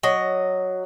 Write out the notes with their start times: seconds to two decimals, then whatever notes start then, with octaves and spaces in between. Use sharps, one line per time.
0.03 F#3 D#5